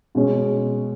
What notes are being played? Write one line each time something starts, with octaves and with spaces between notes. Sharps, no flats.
B2 G#3 C#4